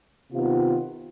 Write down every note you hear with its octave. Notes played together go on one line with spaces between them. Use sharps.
C3 D#3 B3 F4